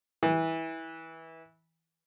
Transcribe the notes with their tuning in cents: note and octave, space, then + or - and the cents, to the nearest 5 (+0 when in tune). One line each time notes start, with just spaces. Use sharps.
E3 -20